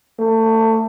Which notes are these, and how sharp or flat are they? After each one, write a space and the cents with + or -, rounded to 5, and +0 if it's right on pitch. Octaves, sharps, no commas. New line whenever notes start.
A3 +25